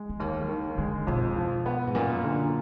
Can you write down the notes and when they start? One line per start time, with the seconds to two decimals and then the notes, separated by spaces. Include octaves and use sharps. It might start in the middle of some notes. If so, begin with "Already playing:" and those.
Already playing: G#3
0.09 B3
0.20 D#2 A#3
0.49 D3 D#3
0.78 D3 G#3
1.07 F2 B2
1.36 F3
1.66 B3
1.87 G#2
1.95 F#2 A#2
2.24 D3